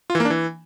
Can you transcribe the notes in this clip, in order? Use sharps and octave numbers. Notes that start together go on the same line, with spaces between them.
F4
E3
A#3
D4
E3